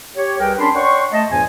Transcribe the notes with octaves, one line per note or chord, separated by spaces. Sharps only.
G4 C#5
C2 G4 G#4 A#4 B4 G5
C#4 D4 A#4 B5 C6
C#5 D5 F#5 G5 C6 C#6
A3 D#5 A5
E2 G2 A#2 F3 G#5